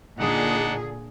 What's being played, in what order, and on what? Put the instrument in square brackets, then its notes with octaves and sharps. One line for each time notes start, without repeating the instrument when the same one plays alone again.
[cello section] A#2 D3 G#4 [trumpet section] D4 D#4 F#5